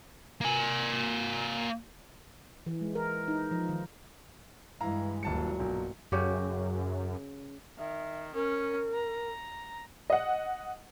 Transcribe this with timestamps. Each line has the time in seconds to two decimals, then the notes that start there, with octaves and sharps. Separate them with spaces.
0.41 A#3 G#5
2.66 E3
2.81 G#3
2.95 A#4
3.28 D#4
3.51 F3
3.69 D#3
4.80 G2 E3 G#3 E4 F5 A#5
5.23 D#1 A#2 F#3 A5 C#7
5.60 B1
6.12 F#2 C#3 F#4 G4
7.78 D#3 E5
8.34 C#4 A#4
8.94 A#5
10.10 D#5 F#5